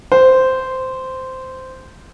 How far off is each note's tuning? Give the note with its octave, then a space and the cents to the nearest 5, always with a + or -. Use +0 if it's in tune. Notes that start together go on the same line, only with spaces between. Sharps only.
C5 -10